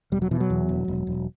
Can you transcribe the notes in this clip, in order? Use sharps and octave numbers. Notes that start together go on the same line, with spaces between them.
E1 G3
F#3
B2 E3
F#3
E2
E1
E1
E1